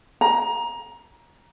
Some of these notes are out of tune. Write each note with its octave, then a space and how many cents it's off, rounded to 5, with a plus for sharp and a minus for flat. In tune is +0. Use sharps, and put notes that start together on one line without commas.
A#5 +20